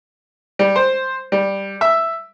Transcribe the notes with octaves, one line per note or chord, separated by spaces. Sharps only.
G3
C5
G3
E5